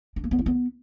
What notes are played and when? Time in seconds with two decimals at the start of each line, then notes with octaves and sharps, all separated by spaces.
0.16 D4
0.24 A#3
0.31 B3
0.39 E4
0.46 B3